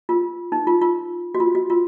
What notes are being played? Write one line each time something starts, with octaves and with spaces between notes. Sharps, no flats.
F4
D#4
F4
F4
F#4
F4
F#4
F4